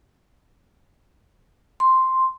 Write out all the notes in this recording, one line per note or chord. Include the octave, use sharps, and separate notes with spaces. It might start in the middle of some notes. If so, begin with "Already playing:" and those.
C6